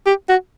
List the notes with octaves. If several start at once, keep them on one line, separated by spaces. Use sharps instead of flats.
G4
F#4